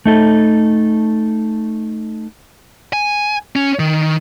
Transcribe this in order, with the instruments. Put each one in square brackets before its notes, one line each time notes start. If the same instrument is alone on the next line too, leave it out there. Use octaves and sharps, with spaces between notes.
[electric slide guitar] A3 D#4 A4
[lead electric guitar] G#5
C#4
D#3